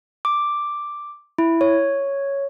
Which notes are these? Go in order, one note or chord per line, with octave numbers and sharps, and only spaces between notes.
D6
E4
C#5